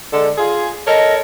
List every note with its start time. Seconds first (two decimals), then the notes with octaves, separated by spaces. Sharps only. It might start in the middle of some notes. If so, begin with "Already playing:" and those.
0.12 D3 G#3 A4
0.38 F4 G#4
0.87 A4 A#4 C#5 D#5